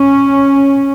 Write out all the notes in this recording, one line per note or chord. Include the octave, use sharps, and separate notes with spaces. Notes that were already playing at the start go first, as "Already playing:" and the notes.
Already playing: C#4